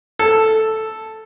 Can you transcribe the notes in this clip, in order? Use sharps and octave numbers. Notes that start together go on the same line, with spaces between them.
A4